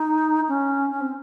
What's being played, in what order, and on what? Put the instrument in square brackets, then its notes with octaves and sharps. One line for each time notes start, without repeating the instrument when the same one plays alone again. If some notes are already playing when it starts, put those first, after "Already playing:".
Already playing: [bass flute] D#4
C#4
C#4
C4